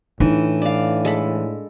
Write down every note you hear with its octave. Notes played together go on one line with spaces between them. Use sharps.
A2 E3 D4 D#4
D5 F5
G#3 A4 B5